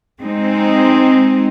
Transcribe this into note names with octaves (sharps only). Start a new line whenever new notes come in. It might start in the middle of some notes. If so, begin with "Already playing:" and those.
G#3 C4 D#4